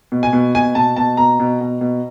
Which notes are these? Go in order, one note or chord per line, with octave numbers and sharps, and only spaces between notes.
B2
G#5
B2
B2 G#5
B2 A5
B2 A5
B2 A#5
B2
B2
B2